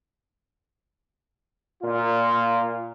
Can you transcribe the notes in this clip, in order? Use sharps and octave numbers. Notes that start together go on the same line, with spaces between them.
A#2 F4